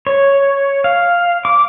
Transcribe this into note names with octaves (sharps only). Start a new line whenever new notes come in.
C#5
F5
D6